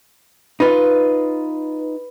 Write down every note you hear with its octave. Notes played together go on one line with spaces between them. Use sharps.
D#4 F4 B4